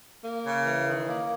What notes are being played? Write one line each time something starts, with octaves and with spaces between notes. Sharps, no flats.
A#3
C#3
E3
D#3
A#3